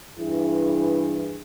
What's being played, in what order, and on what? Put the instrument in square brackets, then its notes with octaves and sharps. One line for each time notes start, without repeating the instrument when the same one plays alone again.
[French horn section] G2 E3 E4 G#4